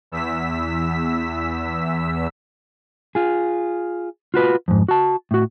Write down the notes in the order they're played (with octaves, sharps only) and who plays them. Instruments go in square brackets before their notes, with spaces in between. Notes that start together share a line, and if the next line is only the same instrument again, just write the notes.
[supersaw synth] E2 E6 B6
[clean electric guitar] F4 G#4
F4 F#4 B4
F2 G#2
F#4 A5
A2 F#4